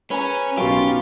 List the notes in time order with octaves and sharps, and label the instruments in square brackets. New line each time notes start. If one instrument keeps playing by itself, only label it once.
[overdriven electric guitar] C#4 [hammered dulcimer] B4 G#5 A#5
[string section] B1 B2 F4 [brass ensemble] F#2 [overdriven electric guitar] G4 [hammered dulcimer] F5 C#6